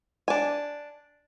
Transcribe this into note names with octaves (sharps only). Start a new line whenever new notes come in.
D4 G#5